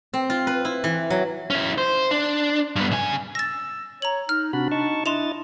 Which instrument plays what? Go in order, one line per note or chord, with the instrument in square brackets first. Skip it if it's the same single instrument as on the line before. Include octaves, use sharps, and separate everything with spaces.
[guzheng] C4
F4
B4
E4
E3
F#3
[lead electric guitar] C#4 E4
C5
D4
G2 B3
C#3 G#5
[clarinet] E6 [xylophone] A6 A#6
[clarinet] C#5 [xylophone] A#5 F#7
[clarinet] D#4 [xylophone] F6
[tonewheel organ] C3 F#4 B5 [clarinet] D4
[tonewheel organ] D#4 A5 C#6
[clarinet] D4 [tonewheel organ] E4 D#5 A6 [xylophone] C6 E7 F7